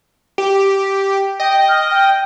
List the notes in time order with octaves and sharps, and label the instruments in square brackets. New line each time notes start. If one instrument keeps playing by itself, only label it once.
[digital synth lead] G4
[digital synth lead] D#5 [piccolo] G5
[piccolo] F6
G5